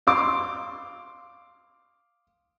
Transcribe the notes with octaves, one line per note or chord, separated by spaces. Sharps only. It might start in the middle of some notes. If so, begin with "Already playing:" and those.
F5 C6 D6